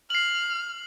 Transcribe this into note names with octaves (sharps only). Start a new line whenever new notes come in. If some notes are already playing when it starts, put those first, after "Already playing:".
F6 C7 F#7